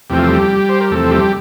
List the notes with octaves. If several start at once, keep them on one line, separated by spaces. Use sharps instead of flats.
E2 C3 F3 A3 C4 G4
F4
G3 G4
C5
A#4
E2 C3 F3 A3 C4 A4
G3 G4